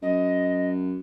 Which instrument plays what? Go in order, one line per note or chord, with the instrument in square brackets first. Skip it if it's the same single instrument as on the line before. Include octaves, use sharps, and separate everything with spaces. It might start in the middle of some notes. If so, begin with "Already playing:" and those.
[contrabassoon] F#2 [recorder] D#5